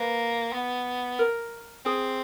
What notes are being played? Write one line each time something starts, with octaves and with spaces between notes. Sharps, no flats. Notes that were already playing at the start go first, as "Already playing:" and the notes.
Already playing: A#3 B4
B3
A#4
C4 G#4